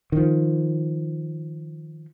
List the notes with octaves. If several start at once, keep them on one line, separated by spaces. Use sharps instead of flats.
D#3 F3